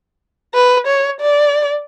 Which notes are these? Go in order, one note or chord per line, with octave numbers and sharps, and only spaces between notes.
B4
C#5
D5